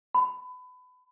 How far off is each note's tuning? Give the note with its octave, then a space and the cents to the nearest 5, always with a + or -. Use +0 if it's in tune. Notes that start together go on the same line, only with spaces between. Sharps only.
B5 +25